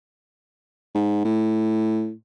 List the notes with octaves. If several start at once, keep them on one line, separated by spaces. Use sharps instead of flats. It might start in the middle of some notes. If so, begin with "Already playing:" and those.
G#2
A2